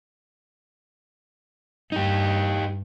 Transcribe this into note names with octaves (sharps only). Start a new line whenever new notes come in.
G2 D#4 G4